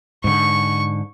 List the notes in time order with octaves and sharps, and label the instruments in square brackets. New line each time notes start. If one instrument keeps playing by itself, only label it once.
[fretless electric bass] G#2 D3 [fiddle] C#6